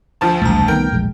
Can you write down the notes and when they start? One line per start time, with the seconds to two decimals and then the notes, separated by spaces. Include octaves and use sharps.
0.21 D2 F3 A5
0.42 E1 C2 A3 A#5
0.68 C2 D#3 B3 A#4 G5
0.91 E1 A#1 G#3